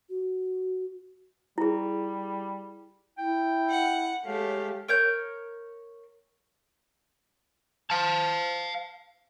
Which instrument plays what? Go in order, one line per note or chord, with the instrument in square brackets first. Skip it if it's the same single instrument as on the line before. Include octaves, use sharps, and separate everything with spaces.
[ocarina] F#4
[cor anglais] G3 [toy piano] E4 G#4
[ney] E4 [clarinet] G5
[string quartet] F#5
[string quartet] G#3 A3 G4 [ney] C#5 [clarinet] F5
[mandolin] A#4 C#5 G6
[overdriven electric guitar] F5 A5